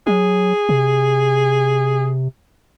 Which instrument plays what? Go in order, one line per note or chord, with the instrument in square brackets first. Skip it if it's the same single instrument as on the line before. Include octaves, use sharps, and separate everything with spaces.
[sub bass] F#3 [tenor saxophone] G#4
[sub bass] C3